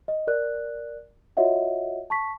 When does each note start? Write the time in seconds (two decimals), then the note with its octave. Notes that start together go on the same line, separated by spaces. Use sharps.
0.08 D#5
0.27 A#4 D5 F#6
1.37 F4 F#4 C#5 D#5 E5 F#5
2.10 A5 C#6 B6